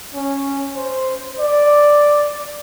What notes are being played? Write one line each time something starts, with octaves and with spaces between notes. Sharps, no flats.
C#4
C5
D5